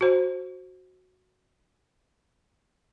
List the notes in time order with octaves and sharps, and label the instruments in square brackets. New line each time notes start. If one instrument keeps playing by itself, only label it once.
[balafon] F#4 C5